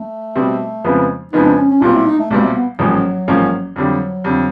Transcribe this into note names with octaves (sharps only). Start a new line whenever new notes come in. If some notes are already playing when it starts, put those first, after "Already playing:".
Already playing: A3
B2 G3 C4
F2 C#3 F3 G#3 B3
F2 C#3 F3 G#3 B3 D#4
D4
C#4
C#4
B1 A#2 G3 C4 F4
E4
D#4
A3
B1 A#2 G3 G#3 C4
A3
B3
A1 G#2 F3 F#3 A#3 C#4
A1 G#2 F3 A#3 C#4
F2 D3 F#3 G3
F2 D3 G3